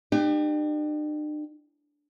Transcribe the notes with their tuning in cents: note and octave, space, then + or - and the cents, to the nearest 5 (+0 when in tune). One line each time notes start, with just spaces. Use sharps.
D4 +45 G4 +15